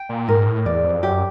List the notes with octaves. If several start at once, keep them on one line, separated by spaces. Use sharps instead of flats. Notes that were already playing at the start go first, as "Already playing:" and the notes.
Already playing: G5
A#2
G#2 A#4
A2
E2 D5
F2
F#2 G4